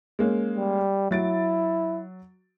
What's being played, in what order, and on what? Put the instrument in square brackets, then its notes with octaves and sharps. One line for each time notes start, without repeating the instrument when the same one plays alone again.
[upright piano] G#3 A#3 C#4
[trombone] G3
[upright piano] F#3 A6 D7 [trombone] E4